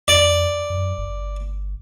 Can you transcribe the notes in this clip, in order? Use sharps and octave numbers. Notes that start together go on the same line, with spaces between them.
F2 D5
F#2
G1